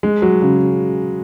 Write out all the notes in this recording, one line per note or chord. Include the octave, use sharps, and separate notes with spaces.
G#3
F#3
C#3